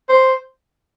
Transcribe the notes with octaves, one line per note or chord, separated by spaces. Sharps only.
C5